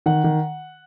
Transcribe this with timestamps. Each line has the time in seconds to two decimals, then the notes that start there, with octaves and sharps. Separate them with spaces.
0.06 D#3 F#5
0.24 D#3